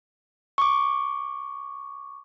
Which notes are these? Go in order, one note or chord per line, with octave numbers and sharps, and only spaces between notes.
C#6 D6